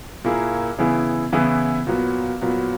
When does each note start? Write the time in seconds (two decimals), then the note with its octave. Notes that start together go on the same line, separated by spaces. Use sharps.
0.24 A#2 A#3 E4 G#4
0.78 C#3 E3 B3 E4 G#4
1.32 C#3 E3 B3 E4 G#4
1.87 A#2 F#3 B3
2.42 A#2 F#3 B3